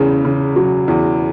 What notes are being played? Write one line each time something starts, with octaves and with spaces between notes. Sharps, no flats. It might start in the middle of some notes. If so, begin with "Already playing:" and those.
Already playing: E2 C#3
C#3
F#3
E2